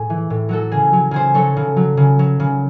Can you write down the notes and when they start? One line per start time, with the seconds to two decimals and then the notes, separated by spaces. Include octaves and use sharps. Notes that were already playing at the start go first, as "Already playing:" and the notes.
Already playing: A2 G#4
0.10 E3
0.30 A2
0.49 F#3 F#4 A4
0.72 C#3 G#4
0.93 F#3
1.11 C#3 G#4 C5
1.34 F#3 A4 C#5
1.57 C#3
1.77 F#3
1.97 C#3
2.19 F#3
2.40 C#3